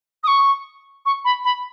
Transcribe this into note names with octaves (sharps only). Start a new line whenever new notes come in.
D#6
C#6
C#6
B5
B5